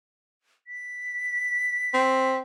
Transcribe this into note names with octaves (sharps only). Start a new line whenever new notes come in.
B6
C4